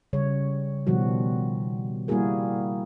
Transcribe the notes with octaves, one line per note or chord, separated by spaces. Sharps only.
C#3 G3 C#5
B2 D#3 F3 G3 F#4
G3 A#3 E4 F#4 G#4 A#4